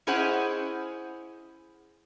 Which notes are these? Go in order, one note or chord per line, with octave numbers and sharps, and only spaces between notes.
C#4 E4 G#4 C5 D#5 F#5